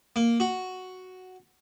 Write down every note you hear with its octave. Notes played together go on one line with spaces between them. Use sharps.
A#3
F#4